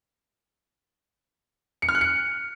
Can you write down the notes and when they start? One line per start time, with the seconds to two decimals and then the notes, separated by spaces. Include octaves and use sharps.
1.82 C#7
1.89 F6
1.95 F#6
2.01 C#7